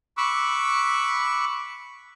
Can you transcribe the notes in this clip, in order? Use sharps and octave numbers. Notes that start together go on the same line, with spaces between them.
B5 C#6 D6 E6 F#6